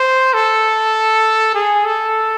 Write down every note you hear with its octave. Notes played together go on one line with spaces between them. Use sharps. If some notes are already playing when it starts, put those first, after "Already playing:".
Already playing: C5
A4
G#4
A4